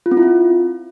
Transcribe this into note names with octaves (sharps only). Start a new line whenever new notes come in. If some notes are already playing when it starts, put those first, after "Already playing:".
F4
C4
E4
F4